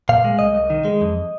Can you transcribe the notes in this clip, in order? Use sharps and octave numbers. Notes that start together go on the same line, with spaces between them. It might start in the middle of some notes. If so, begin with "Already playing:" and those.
A#2 F5
G#3
C2 D#5
C2
D#3
G#3
F2